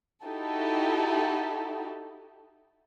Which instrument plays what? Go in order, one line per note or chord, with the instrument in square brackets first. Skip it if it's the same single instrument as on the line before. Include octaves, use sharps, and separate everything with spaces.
[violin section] D#4 E4 F#4 G4 A4